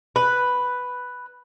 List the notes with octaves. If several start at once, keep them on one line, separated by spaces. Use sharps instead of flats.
B4